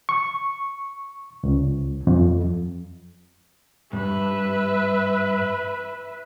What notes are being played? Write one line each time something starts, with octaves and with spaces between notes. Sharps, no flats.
C#6
C#2
F2
G2 B4 E5